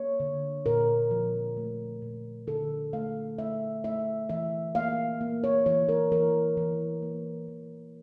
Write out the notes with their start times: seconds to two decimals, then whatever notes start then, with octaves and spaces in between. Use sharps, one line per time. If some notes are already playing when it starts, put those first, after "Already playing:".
Already playing: A#3 C#5
0.20 D3
0.66 A#2 A#4
1.11 F3
1.57 A3
2.02 A#2
2.47 D3 A4
2.93 A3 F5
3.38 A3 E5
3.84 A3 E5
4.29 E3 E5
4.75 A#3 F5
5.21 A#3
5.44 C#5
5.66 E3 C#5
5.89 A#4
6.12 E3 A#4
6.57 E3
7.02 A#3
7.48 E3